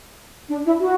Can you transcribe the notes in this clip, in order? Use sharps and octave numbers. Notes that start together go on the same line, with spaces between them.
D4
E4
F#4